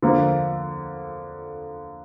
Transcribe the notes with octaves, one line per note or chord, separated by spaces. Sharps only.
D3 F3 A#3